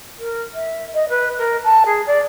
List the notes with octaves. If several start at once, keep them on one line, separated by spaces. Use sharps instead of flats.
A#4
E5
D#5
B4
A#4
A5
G#4
D5